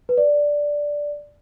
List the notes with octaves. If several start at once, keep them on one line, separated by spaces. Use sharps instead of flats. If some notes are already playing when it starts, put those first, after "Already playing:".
B4
D5